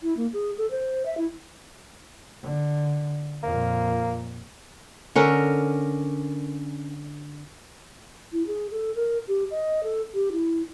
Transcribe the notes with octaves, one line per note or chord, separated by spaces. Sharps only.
E4
A#3
G#4
A4
C5
E5
E4
D3
F2 A#2 A#3
D3 C#4 A#4
E4
G#4
A4
A#4
G4
D#5
A4
G4
E4